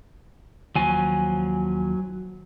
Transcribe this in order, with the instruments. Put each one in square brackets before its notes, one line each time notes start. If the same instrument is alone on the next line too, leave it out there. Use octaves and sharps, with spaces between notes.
[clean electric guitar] D#2 F3 [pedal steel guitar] F#3 G#5